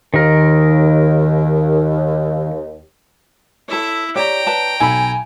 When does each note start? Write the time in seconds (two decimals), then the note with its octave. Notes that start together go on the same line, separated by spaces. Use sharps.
0.14 D#2 D#3 A#4
3.68 E4 A4 C#5 E5
4.16 G4 C#5 D5 G5 A#5
4.47 B4 A5
4.80 B1 A4 G#5 B5